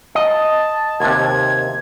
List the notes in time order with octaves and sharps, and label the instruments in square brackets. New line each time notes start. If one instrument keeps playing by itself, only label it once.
[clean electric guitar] D#5 [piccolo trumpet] A5
[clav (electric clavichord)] D#2 C3 [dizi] G#6